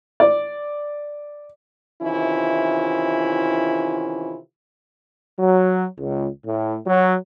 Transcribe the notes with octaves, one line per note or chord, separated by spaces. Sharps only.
D5
C3 D#3 E3 C#4 E4 F4
F#3
C#2
A2
F#3